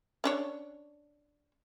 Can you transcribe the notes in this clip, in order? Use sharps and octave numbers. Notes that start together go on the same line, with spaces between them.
C#4 D4 C#5